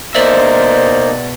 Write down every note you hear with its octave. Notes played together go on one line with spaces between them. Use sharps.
B2 A#3 D#4 C5 D5 E5